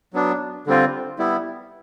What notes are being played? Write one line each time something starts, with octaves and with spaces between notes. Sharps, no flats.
F#3 B3 D4
D3 G3 C4 F4
G3 B3 E4